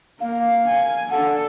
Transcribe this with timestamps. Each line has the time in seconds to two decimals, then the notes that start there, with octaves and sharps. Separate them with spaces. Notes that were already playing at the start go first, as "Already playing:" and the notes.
0.21 A#3 F5
0.69 G#5
1.10 D4 A4 F#5